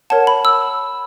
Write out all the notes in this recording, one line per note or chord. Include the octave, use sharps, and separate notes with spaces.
A#4 C#5 F#5 A5
B5
E6